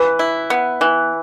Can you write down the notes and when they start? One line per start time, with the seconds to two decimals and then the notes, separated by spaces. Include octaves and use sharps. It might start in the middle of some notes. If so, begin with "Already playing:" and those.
Already playing: E3 B4
0.19 E4
0.50 B3
0.81 E3